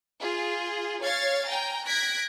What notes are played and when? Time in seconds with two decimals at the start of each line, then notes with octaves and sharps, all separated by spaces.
0.19 F4 G#4
1.01 C#5 F5 G#6 A6
1.47 G5 G#5 A#5
1.86 F#6 G#6 A#6 B6 D7